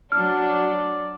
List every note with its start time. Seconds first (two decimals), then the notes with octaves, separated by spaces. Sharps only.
0.12 F#3 D4 D5 F6